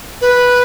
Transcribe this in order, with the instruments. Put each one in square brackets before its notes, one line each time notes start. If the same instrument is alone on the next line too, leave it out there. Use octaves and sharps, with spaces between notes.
[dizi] B4